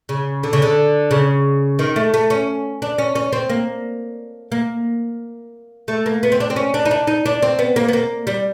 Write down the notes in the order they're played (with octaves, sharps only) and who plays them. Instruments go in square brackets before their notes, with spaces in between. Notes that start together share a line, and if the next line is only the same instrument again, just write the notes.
[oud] C#3
D3
C#3
D3
C#3
D#3
A3
A3
C#4
D4
C#4
C#4
C4
A#3
A#3
A3
A#3
B3
C4
D4
C4
C#4
D4
D#4
D4
D#4
D4
C4
B3
A#3
B3
A#3
G3